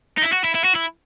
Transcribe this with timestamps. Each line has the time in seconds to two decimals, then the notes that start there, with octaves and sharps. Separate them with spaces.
0.18 D#4
0.23 E4
0.32 F#4
0.44 E4
0.55 E4
0.65 F#4
0.76 E4